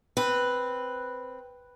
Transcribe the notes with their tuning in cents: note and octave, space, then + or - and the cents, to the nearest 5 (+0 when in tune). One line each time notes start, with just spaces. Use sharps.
C4 +0 B4 +0